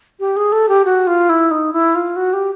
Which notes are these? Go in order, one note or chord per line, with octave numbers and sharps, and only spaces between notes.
G4
G#4
A4
G4
F#4
F4
E4
D#4
E4
F4
F#4
G4